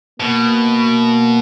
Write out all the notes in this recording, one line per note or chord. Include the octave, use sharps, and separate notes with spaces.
B2 A#3